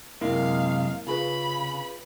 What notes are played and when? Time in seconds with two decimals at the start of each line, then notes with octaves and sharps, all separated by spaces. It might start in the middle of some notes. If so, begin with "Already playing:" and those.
0.21 F#2 C3 G#3 A#3 E4 F5
1.07 C#3 F4 G#4 B4 B5